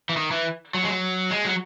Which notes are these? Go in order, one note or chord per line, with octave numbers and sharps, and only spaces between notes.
E3
D#3
E3
F#3
G#3
F#3
G#3
F#3